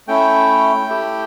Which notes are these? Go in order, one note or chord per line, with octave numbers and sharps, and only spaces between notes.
A3 C#4 E4 G5
A3 E4 G4